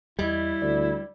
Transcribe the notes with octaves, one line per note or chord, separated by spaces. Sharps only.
E2 G3 E4 D#5 G#6
D2 D5